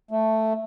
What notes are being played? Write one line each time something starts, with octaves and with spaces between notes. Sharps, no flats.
A3